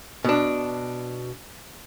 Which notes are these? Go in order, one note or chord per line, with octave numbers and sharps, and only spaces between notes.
B2 D4